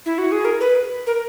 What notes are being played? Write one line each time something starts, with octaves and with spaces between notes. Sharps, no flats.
E4
F#4
G#4
A#4
B4
A#4